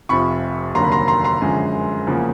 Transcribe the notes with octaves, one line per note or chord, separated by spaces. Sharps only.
F1 F2 C3 F3 B5 C#6
F1 D#2 D3 F#3 A#3 A#5 C6
B5
A#5 C6
A#5 C6
A#5 C6
F#2 D3 F3 G#3
E2 C#3 F3 A#3